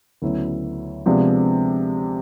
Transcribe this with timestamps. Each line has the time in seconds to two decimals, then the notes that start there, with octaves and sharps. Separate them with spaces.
0.22 D2 C#3 F#3 B3 E4
1.06 C3 F3 G#3 B3 D4